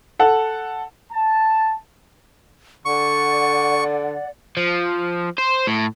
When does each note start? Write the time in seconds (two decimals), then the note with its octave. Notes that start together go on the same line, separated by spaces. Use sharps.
0.19 A4 F#5
1.12 A5
2.85 D3 D5 F#5 C#6
4.57 F3
5.38 C5
5.67 A2